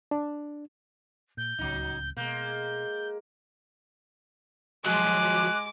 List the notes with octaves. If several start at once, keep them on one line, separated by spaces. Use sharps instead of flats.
D4
A#2 G6
D1 C#2 F#3 D#4
B2 G#3 A#3 G6
F3 F#3 G#3 D6 F#6